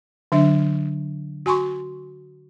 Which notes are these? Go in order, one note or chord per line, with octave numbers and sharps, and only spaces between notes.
D3 F#3 D4 E5
F#4 G#5 C6 C#6